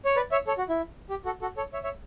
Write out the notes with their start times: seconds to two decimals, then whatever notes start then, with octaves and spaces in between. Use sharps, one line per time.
0.05 C#5
0.16 B4 D5
0.31 C#5 E5
0.47 A4 C#5
0.58 F#4
0.69 E4
1.10 G4
1.25 F#4 A4
1.41 F#4 A4
1.57 A4 C#5
1.73 C#5 E5
1.84 C#5 E5